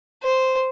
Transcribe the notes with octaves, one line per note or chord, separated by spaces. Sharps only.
C5